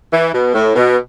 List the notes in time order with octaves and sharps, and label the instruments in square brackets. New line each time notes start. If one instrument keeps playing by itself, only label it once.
[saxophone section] E3
B2
A2
B2